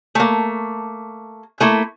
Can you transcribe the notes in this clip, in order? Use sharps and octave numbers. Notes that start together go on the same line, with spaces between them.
A3 A#3
A3 A#3 E4